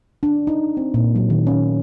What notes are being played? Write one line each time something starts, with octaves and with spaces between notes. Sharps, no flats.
D4
D#4
C4
A#2
F#3
D#3
C#4